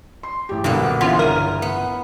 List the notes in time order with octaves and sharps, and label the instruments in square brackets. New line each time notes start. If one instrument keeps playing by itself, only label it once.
[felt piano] C6
A1 G4
[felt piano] B1 A#2 [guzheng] D3 A#3 B3
[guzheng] C#3 E3 [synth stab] B3 F4
[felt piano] G1 D#7 [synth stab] A#4
[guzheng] B3